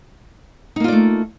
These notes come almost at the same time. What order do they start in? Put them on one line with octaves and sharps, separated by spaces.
D#4 A#3 F4 D5 A3